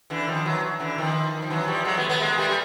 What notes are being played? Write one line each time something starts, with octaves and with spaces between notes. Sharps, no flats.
D3 E3
D#3 F3
E3 F#3
D3 E3
D#3 F3
F3
E3 F#3
F3 G3
F#3 G#3
A3 B3
A3 B3
G#3 A#3
G3 A3
G3